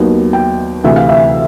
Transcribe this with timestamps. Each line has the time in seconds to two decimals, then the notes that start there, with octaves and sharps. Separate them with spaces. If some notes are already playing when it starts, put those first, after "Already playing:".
Already playing: D#2 D#3 F#3 B3
0.33 G5
0.84 D2 C3 E3 E5
0.96 F5
1.09 E5